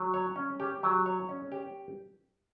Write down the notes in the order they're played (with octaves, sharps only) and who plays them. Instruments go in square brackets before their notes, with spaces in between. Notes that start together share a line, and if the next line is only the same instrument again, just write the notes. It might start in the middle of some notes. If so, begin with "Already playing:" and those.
Already playing: [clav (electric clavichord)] F#3
C#5
C#4
G4
F#3
C#5
C#4
G4